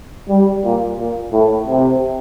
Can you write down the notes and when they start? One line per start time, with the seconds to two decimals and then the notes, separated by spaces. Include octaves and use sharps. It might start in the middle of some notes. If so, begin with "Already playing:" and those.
0.29 G3
0.64 A#2
0.99 A#2
1.32 A2
1.67 C3